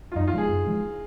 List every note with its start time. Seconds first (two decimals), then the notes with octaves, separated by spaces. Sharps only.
0.12 F4
0.16 F#2 D#4
0.27 F4
0.33 F3 G#3 G#4
0.49 F#2
0.66 F3 G#3